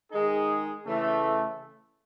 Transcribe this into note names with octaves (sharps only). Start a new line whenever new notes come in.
D#3 G#3 D#4 G#4
C#3 E3 A3